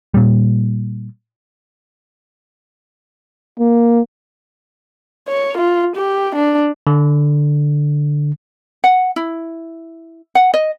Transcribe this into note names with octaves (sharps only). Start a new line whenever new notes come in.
A#2 G3
A#3
C#5
F4
G4
D4
D3
F#5
E4
F#5
D#5